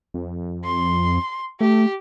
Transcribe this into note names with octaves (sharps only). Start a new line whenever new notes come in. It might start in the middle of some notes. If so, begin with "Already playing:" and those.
F2
C6
A3 G4